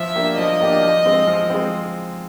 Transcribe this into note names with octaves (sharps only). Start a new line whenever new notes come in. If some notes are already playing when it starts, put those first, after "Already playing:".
Already playing: F3 E5
A#3 D4 G4
F3 D#5
A#3 D4 G4
F3
G#3 C4
F3
G#3 C4